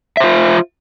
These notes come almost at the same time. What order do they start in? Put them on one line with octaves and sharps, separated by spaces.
E5 C5 F4